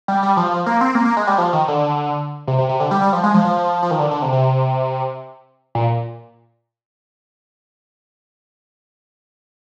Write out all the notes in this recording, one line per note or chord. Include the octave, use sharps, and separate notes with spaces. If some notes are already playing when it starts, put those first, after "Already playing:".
G3
G3
F3
F3
A#3
C4
A#3
A#3
G#3
G3
F3
D#3
D3
C3
C3
C3
D3
G3
G3
F3
G#3
F3
F3
F3
D#3
D3
D3
C3
C3
A#2